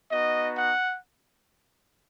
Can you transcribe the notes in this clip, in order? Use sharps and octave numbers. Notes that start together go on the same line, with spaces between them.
B3 D#4 F#4 D#5
F#5